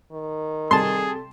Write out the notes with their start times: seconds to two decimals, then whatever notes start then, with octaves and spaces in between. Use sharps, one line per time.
0.12 D#3
0.71 C3 G3 G#4 A4 A5 C6